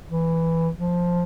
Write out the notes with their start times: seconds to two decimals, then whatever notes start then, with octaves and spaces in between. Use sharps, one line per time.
0.10 E3
0.76 F3